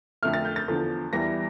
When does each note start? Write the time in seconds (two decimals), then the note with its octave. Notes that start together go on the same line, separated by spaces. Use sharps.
0.23 F2 D3 A3 F6
0.33 A6
0.45 G6
0.56 A6
0.68 E2 D3 F3
1.13 E2 E3 G3 A#6